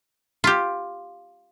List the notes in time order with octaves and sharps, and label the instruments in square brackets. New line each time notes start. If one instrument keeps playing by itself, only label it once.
[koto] F4 G4